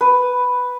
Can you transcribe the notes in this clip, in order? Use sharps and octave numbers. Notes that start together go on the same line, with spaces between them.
B4